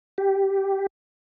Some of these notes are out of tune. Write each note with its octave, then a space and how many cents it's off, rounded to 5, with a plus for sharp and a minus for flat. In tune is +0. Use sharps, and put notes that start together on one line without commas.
G4 -5